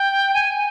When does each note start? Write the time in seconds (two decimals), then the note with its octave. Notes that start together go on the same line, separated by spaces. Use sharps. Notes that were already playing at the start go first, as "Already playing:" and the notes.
Already playing: G5
0.34 G#5